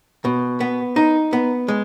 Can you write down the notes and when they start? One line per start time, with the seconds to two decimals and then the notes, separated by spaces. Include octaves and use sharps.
0.25 B2
0.60 B3
0.96 D#4
1.33 B3
1.68 G#3